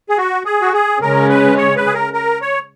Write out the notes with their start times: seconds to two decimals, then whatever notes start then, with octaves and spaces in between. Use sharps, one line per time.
0.09 G#4
0.18 F#4
0.45 G#4
0.61 F#4
0.73 G#4
1.01 C#3 G#3 C#4 A#4
1.29 B4
1.58 C#5
1.76 B4
1.86 G#4
1.94 A#4
2.13 A#4
2.42 C#5